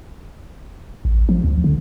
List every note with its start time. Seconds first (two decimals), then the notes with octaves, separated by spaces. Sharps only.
1.05 A1
1.29 F3
1.44 D2
1.64 D3